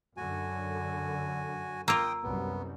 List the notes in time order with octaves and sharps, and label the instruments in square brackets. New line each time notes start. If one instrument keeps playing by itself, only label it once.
[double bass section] F#2 D3 [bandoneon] F#4 G#5
[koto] A#3 F4 [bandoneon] G5 D#6 [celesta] A#5 E6 D7
[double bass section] C2 F#2 [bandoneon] B3